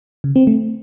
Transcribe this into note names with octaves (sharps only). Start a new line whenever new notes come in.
C#3
C4
A3